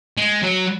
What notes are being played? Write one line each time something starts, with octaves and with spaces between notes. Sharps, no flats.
G#3
F#3